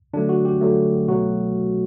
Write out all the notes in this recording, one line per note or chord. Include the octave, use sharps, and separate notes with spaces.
D3 F#3 A3 D4
F#4
G4
D3 F#3 A3
B2 F#3 A3 F#4